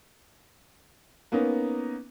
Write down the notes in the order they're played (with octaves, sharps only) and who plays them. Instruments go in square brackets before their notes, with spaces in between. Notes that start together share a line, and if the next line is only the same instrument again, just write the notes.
[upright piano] A#3 B3 C#4 D#4